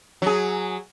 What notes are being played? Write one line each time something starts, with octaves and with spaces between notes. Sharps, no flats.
F#3 G#4